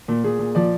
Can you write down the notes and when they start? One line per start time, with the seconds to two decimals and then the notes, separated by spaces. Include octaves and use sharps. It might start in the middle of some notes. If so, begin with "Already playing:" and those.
0.08 A#2
0.24 A#2 G#4
0.39 A#2
0.55 F3 D5